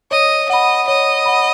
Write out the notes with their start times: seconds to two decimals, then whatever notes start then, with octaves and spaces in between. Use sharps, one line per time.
0.11 C#5 D#5
0.50 D#5 F#5 B5
0.88 C#5 D#5
1.26 F#5 B5